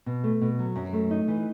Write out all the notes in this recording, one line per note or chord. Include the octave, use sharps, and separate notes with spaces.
B2
A3
B2
F#3
F#2
A3
D#4
E3